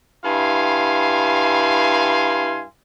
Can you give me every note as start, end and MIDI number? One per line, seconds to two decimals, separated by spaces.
0.24 2.66 43
0.24 2.66 64
0.24 2.66 77
0.24 2.66 80
0.24 2.66 84